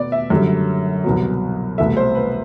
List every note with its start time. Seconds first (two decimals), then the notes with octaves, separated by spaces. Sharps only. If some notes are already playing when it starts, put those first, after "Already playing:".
Already playing: B2 B3 D5
0.12 E5
0.30 F#2 D3 G3
1.04 C2 B2 F#3
1.78 C2 B2 A3 E5
1.97 C5
2.15 B4